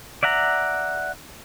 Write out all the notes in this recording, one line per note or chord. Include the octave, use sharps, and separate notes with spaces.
D5 E5 F#5 A#5